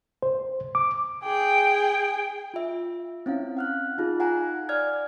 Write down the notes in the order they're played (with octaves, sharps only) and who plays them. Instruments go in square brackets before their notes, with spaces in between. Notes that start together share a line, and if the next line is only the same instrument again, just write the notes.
[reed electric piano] C5
D6
[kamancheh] G#4 G5
[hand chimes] F4 E5
C4 C#4 E4 F5
F#5 F6 F#6
D#4 F4 G#4
F5 F#5 G#5 A#5 F#6
D5 F6 G#6